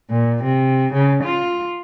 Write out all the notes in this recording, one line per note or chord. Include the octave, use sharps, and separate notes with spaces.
A#2
C3
C#3
F4